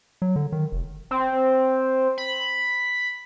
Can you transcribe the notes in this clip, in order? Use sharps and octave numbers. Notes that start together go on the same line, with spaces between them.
F#3
D3
D#3
F1
C4
B5